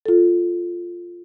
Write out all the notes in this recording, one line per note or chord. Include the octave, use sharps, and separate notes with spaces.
F4 A4